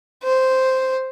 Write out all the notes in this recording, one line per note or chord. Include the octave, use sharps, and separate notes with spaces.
C5